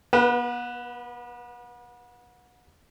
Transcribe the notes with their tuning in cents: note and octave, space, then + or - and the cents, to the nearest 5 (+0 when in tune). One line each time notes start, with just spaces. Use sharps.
B3 -35 B4 +0